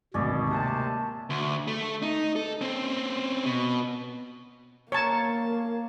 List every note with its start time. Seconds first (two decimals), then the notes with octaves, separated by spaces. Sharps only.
0.14 G#1 D2 B2 C#4 D5 D#5
0.49 C3 A#3 A5
1.30 D2
1.68 A3
2.02 D#4
2.36 A4
2.61 C4 C#4
3.46 B2
4.92 A#3 A#4 C#5 A5 A#5